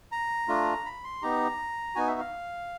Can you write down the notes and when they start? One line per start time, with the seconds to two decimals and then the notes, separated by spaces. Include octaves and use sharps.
0.12 A#5
0.48 A3 D4 F4
0.86 B5
1.04 C6
1.22 B3 D#4 G4 A#5
1.95 B3 D#4 F#4 G#5
2.07 E5
2.20 F5